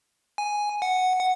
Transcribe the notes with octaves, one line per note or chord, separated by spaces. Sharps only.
G#5
F#5
F#5